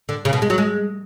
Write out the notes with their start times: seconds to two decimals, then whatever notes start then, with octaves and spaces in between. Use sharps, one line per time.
0.09 D3
0.25 C#3
0.33 B2
0.42 G#3
0.50 F#3
0.58 G#3